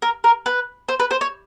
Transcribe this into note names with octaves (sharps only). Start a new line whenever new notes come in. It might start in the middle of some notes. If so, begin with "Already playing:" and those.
A#4
A#4
B4
C5
B4
C5
C#5